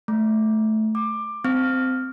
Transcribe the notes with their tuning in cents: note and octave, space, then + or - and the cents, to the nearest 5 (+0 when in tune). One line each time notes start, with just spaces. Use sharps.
A3 -15
D6 +15
C4 -15